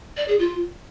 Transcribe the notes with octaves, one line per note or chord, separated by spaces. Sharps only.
D5
G#4
F4